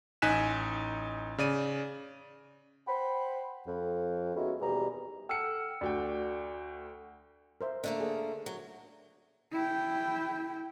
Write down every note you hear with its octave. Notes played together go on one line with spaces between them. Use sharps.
A1 D#4 G#5 F#6 B6 E7
C#3 D5 D#7
C5 F#5 G5 B5
F2
G#3 B3 C#4 D#4 E4 F#4
D#2 B2 E3 G3 G#4 A#5
A4 F#5 G5 E6 F6 C#7
D2 F#4 D5 G5
A#4 C5 E5
D3 A3 A#3
G#4 A#4
F#3
E4 G5